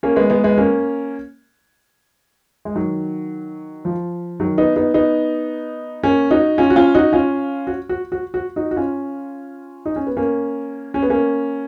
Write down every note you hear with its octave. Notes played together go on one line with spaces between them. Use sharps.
A#3 C#4
G#3 B3
G#3 B3
G#3 B3
A#3 C#4
G#3
D#3 F#3
F3
D#3 F#3
B3 D#4
B3 D#4
B3 D#4
A#3 C#4
D#4 F#4
C#4 F4
F#4
C#4 F4
D#4 F#4
C#4 F4
F#4
F#4
F#4
F#4
D#4 F#4
F#4
C#4 F4
D#4
C#4
B3
A#3 C#4
C#4
B3
A#3 C#4